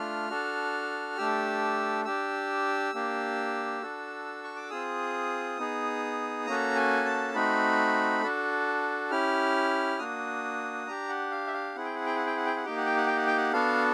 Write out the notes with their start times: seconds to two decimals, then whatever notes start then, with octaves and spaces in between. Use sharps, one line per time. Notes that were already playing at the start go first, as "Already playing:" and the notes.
Already playing: A3 D4 F4 F6
0.30 D4 F#4 A4
1.17 A3 D4 G4 E6
2.05 D4 G4 E6
2.94 A#3 D4 G4
3.82 D4 F#4 A4
4.44 C#6
4.56 D6
4.70 C4 F4 G#4 D#6
5.58 B3 D#4 G#4
6.46 A#3 C#4 F#4 A4 A#5
6.76 G#5
7.05 A5
7.34 A3 C4 D#4 F#4 B5
8.23 D4 F#4 A4
9.11 C#4 E4 G4 F6
9.99 A#3 D4 F#4 D#6
10.87 D4 G4 A#5
11.09 F#5
11.31 F5
11.47 E5
11.53 F5
11.75 C4 E4 G#4 F#5
11.85 G5
11.95 F#5
12.06 G5
12.16 F#5
12.26 G5
12.36 F#5
12.46 G5
12.56 F#5
12.64 A#3 D#4 G4 G5
12.77 F#5
12.86 G5
12.97 F#5
13.07 G5
13.17 F#5
13.27 G5
13.37 F#5
13.52 B3 D4 F#4 A4 F5